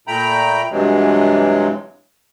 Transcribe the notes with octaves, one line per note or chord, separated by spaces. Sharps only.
A#2 A3 G5 A#5 B5
G2 C3 E3 F#3 G#3